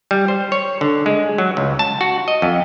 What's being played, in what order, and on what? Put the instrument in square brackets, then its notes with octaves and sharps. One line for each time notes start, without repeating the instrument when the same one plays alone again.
[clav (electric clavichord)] G3
C5
C#5
D3
G#3
F#3
C#2
A5
F#4
D#5
F2